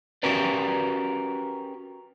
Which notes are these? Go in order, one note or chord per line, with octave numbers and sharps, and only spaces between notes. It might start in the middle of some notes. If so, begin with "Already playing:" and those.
C#4 F#4 G4 A#4 B4 D5